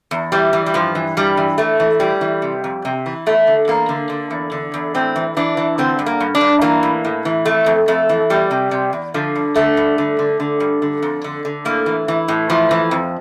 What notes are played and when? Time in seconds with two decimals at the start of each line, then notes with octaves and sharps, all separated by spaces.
0.11 E2
0.32 E3 G3
0.53 E3
0.66 G3
0.74 G2 F3
0.95 E3
1.17 G2 G3
1.37 E3
1.58 E3 A3
1.80 E3
2.00 A2 G3
2.21 E3
2.42 C3
2.64 F2
2.85 C3
3.06 E3
3.26 E2 A3
3.47 D3
3.68 E2 A#3
3.89 D3
4.10 D3
4.31 E2
4.52 D3
4.74 E2
4.95 A2 C4
5.16 E3
5.37 E3 D4
5.57 E3
5.78 D3 C4
5.99 G2
6.06 A#3
6.20 G2
6.35 D4
6.41 G2
6.61 E3 A#3
6.83 A2
7.05 A2
7.25 E3
7.45 F2 A3
7.66 F2
7.88 F2 A3
8.09 E3
8.30 E2 G3
8.51 C3
8.71 C3
8.93 E2
9.14 D3 F3
9.35 G2
9.56 D3 A3
9.77 G2
9.98 D3
10.19 D3
10.40 D3
10.60 G2
10.82 D3
11.02 F2
11.24 D3
11.45 D3
11.65 A2 A#3
11.86 E3
12.08 E3
12.28 A2
12.50 E3 F3
12.71 E3
12.91 F2